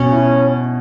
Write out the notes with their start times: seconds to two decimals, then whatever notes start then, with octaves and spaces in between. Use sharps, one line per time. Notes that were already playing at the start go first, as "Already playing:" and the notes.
Already playing: B2 C#4
0.12 E4